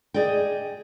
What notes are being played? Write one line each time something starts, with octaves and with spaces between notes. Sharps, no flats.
G#4 D5 D#5 G5